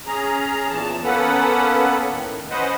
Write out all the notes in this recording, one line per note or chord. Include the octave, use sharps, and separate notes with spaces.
C#4 G#4 A#5
E2 A#2 E3 A5
A#3 B3 C#4 A4 B4 F#5
A2 D#3
C#4 B4 C5 D#5 F#5